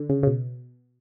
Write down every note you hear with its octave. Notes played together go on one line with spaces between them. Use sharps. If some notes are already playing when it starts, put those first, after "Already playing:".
Already playing: D3
C#3
C#3
B2